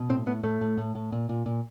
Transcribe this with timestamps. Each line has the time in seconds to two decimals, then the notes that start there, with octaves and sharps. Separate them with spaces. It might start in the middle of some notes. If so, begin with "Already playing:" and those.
Already playing: B2
0.09 A2 C4
0.26 A2 B3
0.43 A2 A3
0.61 A2
0.78 A2
0.95 A2
1.12 A#2
1.29 A#2
1.46 A#2